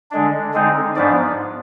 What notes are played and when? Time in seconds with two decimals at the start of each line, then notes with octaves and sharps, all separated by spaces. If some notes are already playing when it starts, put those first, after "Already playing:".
0.11 D3 G#3 D4
0.54 D3 G#3 C4 D#4
0.96 G#2 F3 B3 D4 D5